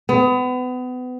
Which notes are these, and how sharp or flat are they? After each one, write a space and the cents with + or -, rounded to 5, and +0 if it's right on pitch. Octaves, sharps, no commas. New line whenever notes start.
B3 +30